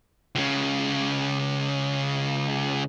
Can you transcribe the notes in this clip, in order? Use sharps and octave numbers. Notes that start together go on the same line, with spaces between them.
C#2 C#3